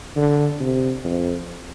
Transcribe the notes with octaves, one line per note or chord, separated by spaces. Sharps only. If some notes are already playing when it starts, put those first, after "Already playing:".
D3
C3
F2